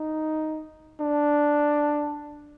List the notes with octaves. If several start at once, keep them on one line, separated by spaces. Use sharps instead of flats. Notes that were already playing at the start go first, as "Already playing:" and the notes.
Already playing: D#4
D4